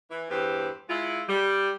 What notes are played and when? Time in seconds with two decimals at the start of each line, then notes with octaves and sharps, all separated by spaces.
0.10 E3
0.30 E2 G2 E3 G4 B4 C5
0.89 G#3 E4 F4
1.29 G3